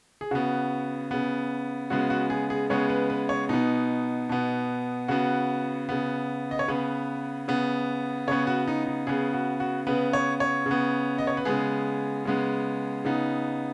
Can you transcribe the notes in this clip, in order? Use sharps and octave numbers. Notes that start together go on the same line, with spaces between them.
G#4
C#3 B3 F#4
C#3 B3
C#3 G#3 B3 F#4
F#4
G#4
G#4
C#3 G#3 B3 C#5
B4
B4
C#5
B2 B3 D#4
B2 B3
C#3 B3 F#4
C#3 B3
D#5
C#5
C#3 B3 B4
C#3 B3
C#3 B3 C#5
F#4
D#4
D#4
C#3 B3 G#4
F#4
F#4
C#3 B3 B4
C#5
C#5
C#3
B3
D#5
C#5
B4
C#3 G#3 B3 G#4
C#3 G#3 B3
C#3 B3 D#4